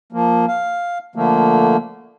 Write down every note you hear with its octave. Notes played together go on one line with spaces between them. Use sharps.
F3 A#3
F5
D3 F3 A3 A#3